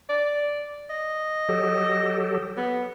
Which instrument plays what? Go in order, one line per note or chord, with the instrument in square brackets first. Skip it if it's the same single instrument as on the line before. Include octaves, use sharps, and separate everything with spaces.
[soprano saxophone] D5
D#5
[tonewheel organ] F#3 G4 A4
[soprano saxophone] B3